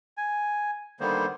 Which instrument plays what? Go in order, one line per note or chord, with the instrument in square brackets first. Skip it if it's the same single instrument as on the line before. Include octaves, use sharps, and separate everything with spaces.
[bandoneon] G#5
D3 D#3 G3 A#3 B3 C5